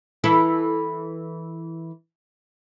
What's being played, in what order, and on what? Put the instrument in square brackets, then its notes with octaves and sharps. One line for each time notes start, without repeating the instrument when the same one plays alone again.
[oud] E3 E4 A4